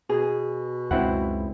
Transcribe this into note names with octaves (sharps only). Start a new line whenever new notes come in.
B2 G#4
C#2 F#2 C4 E4 F#5